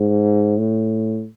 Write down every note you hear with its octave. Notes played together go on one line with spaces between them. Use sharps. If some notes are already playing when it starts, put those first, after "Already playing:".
Already playing: G#2
A2